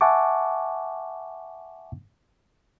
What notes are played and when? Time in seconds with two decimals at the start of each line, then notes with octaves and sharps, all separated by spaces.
0.01 E5 F#5 G#5 A5 C#6 D6